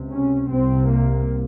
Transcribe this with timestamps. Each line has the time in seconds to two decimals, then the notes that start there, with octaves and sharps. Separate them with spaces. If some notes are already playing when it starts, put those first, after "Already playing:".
Already playing: C#2 C3
0.11 C#4
0.51 C2 C3 C4
0.90 A#3